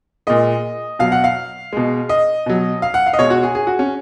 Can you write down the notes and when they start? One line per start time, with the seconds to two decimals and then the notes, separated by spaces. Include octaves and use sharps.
0.27 A#2 G#3 D#5
0.99 B2 F#3 F5
1.12 F#5
1.24 F5
1.73 B2 G#3
2.09 D#5
2.46 B2 F#3
2.82 F5
2.94 F#5
3.06 F5
3.13 D#5
3.19 B2 G#3 C#5
3.30 F#4
3.43 G#4
3.55 G#4
3.67 F#4
3.79 C#4